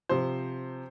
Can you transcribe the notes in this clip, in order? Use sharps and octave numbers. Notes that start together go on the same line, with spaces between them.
C3 F3 C5